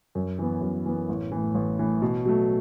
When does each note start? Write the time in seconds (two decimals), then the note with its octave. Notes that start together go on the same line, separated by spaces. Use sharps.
0.15 F#2
0.39 E3 B3
0.61 F#2
0.86 E3 B3
1.09 A1
1.32 A2 E3
1.55 A1
1.79 A2 E3
2.02 B2
2.25 F#3 A3